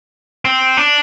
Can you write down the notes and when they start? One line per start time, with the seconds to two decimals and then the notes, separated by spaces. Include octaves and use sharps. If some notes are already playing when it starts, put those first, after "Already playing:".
0.45 C4
0.77 D4